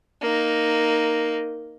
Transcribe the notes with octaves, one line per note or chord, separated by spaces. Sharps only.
A#3 D#4